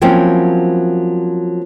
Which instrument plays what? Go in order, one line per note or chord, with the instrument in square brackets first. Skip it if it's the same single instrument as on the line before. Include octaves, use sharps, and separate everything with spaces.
[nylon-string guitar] F3 F#3 A#3 C4 C#4 E4